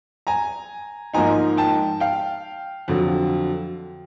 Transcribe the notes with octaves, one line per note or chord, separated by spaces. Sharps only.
G#5 A#5
G#2 F3 A#3 D#4 G#5 A#5
G5 A5
F5 G5
F2 D3 F#3